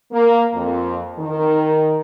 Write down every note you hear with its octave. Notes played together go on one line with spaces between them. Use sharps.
A#3
F2
D#3